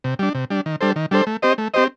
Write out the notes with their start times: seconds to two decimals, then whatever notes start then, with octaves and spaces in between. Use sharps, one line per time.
0.04 C3
0.19 G3 D4
0.35 C3
0.50 G3 D4
0.66 D#3
0.81 G3 D4 A4 C5
0.96 D#3
1.11 G3 D4 A4 C5
1.27 A3
1.42 C4 G4 C5 D#5
1.58 A3
1.74 C4 G4 C5 D#5